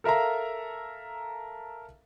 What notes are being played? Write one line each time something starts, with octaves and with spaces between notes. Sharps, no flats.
A4 A#4 E5 F5 A#5